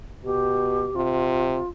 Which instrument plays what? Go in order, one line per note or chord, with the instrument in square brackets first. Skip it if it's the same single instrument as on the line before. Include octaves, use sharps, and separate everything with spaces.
[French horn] B2 [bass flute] G4
[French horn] C3 [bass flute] F4